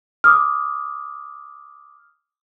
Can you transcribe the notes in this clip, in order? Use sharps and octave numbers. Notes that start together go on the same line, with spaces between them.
D6 D#6 F6